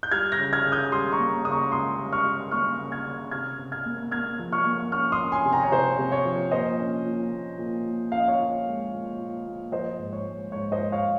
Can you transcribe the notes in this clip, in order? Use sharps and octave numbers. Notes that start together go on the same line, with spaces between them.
G6
G3 F6 G#6
G6 A#6
C#3
F6 G#6
C#3
D#6 G6
G3 C6 D#6
A#5 C#6
A#3
C#3 D#6
A#5 C#6
C#2 C6 D#6
G3
C#6 F6
G3
A#3 C#6 F6
C#3
F6 G#6
C#3
C3 F6 G#6
C3
F6 G#6
A#3
A#3 F6 G#6
F3
C#6 F6
A#3
C#4 C#6 F6
C6 D#6
C#4
G#5 C6
C3
G5 A#5
C#5
C3 C5
C3
C#5
F3
A#2 C5 D#5
C#4
A#2
A#2
A#2
A#2
C#4 F5
D#5
C#5 F5
A#2
G#3
A#2
A#2
A#2
F3 C5 D#5
G#2
C#5
G#3
G#2 C#5
C5 D#5
G#2
C#5 F5